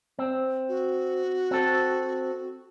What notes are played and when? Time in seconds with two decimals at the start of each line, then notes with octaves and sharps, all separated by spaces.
0.19 C4
0.68 F#4
1.51 C4 A4